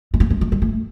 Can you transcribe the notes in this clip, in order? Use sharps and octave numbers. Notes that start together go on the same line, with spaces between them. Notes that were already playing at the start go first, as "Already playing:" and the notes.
G#3
A3
G#3
A3
G#3
A3